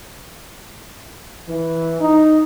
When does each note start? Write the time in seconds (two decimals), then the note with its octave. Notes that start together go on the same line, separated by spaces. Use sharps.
1.48 E3
2.00 D#4